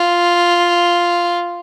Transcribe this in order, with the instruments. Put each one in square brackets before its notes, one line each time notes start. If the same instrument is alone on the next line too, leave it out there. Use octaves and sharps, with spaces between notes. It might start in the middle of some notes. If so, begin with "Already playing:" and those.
Already playing: [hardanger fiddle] F4